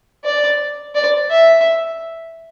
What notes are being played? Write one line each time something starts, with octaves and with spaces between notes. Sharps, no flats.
D5
D5
E5